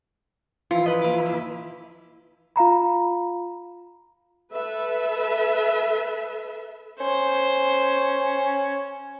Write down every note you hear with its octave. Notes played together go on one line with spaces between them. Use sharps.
E3 F3 E4 F4
B4 D#5
A#3 D6
E5
F4 F5 A#5 B5
A4 B4 E5
C#4 C5